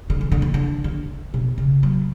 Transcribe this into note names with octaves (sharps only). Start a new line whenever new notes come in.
D3
E3
D3
E3
D3
D3
B2
C#3
F#3